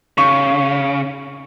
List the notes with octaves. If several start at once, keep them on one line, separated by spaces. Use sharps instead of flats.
C#3 C#6